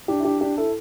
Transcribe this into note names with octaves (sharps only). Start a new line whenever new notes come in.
D4 G4
E4
D4 G4
D4 G4
E4 A4